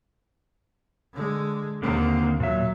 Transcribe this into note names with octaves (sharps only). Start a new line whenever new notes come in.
D3 G#3
D#2 D3 D#3 A#3 C4
A#2 F#3 E5